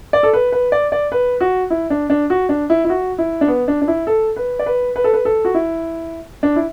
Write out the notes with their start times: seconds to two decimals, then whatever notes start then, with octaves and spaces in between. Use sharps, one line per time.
0.13 D5
0.23 A4
0.33 B4
0.52 B4
0.72 D5
0.92 D5
1.12 B4
1.40 F#4
1.70 E4
1.90 D4
2.10 D4
2.30 F#4
2.49 D4
2.70 E4
2.85 E4
2.89 F#4
3.18 E4
3.41 D4
3.48 B3
3.68 D4
3.82 D4
3.88 E4
4.07 A4
4.36 B4
4.59 D5
4.66 B4
4.96 B4
5.04 A4
5.13 B4
5.25 A4
5.45 F#4
5.54 E4
6.43 D4
6.56 E4